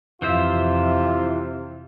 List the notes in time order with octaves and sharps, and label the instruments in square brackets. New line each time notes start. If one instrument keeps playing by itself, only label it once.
[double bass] F2 [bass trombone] C3 [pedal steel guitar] E3 C5 E5 [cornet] F4